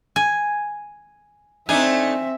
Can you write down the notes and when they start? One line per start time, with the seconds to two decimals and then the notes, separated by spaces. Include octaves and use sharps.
0.16 G#5
1.69 A3 C4 D4 D#4 E5 G#5